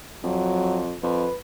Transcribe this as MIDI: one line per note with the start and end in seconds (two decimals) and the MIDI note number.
0.24 0.96 41
0.24 0.83 54
1.03 1.28 41
1.03 1.38 71